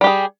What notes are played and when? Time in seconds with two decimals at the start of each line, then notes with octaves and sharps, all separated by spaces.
0.01 G3
0.04 G4
0.07 G#4